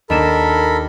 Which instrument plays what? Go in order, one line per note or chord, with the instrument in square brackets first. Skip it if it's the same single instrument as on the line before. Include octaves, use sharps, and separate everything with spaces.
[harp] D#2 D4 E7 [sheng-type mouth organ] A4 A#4 B5